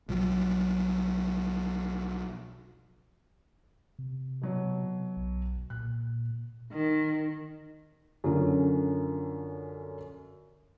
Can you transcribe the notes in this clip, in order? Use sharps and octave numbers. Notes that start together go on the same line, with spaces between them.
B1 F3 F#3
C3
B2 F#3 C#5
B1
A#2 F#6
D#3
F#2 D3 F3 C#4